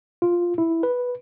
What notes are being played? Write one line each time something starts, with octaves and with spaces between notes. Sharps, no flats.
F4
E4
B4